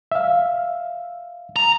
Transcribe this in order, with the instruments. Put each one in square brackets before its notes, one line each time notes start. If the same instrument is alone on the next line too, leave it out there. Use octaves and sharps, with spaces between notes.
[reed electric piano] E5 F5
[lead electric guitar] A#5